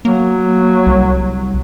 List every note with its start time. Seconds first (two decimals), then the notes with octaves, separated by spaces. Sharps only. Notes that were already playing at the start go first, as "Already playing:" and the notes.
0.05 F#3 A#3
0.87 C2